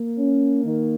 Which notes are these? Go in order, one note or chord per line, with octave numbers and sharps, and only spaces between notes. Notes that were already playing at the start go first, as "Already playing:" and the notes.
Already playing: A#3
C#4
D#3